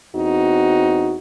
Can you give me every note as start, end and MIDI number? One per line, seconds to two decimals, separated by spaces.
0.15 1.17 40
0.15 1.17 60
0.15 1.17 63
0.15 1.17 66